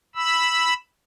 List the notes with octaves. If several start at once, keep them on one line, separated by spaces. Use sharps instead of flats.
B5 E6